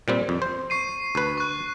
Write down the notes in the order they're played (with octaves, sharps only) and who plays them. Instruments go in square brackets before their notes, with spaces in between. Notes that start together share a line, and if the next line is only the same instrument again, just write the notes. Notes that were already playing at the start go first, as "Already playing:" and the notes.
[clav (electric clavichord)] A#2 G3 C4
F2
C5
[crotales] C#6 C7 D#7
[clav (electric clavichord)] D2 B4
[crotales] C#6 F#6